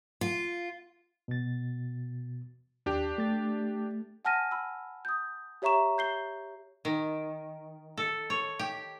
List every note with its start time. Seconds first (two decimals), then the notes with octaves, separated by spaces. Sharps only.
0.21 F4
1.28 B2 A6
2.86 D#2 D4 G4
3.18 A3 A6
4.25 F#5 G#5 A5 F6 A#6 D#7
4.51 B5 E6
5.05 D#6 G6
5.62 G4 C#5 E5 A#5 C#6 E7
5.98 G6 C7 G7
6.85 D#3
7.97 A4
8.30 C#5
8.59 G4